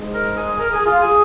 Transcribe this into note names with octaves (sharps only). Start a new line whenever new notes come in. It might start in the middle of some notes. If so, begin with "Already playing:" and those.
Already playing: G#2 G#3
A#4
G#4
A#4
G#4
F4
G#4